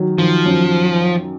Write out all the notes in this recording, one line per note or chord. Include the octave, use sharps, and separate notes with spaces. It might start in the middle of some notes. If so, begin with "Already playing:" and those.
Already playing: D#3 F#3
D#3 F3
F#2